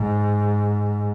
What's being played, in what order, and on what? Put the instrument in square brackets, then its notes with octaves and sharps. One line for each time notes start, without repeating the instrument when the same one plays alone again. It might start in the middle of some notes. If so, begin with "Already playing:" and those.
Already playing: [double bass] G#2